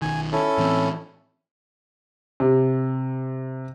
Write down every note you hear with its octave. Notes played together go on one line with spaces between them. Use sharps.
B1 D#3 G#5
C#4 E4 A4
A2 E3 C4
C3